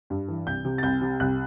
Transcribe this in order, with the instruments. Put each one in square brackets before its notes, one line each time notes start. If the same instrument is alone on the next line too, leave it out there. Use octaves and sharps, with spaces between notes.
[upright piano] G2
E3
C2 G6
C3
A6
C2 G6
C3
C2 F#6